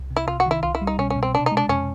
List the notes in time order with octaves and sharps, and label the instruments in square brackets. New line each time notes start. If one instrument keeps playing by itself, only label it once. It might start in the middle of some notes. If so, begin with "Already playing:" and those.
Already playing: [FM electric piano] C2
C3
[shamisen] E4
[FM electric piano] C3 [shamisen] F4
[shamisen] F#4
[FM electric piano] D#3 [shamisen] E4
[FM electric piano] C2 [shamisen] F4
[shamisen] E4
[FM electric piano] G3
[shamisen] D#4
[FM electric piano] B2 [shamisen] C#4
[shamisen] C#4
[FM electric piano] B2
[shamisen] C4
[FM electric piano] C3 [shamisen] D4
[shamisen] D#4
[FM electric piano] G#3
[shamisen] D4
[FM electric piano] F2 [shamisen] C#4